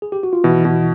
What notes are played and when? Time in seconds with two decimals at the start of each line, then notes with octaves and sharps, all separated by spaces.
0.02 G#4
0.12 G4
0.23 F#4
0.33 F4
0.44 B2 E3 E4
0.65 B2